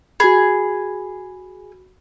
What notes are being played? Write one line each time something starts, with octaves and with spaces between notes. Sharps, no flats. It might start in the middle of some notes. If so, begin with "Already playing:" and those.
F#4 G#4 B5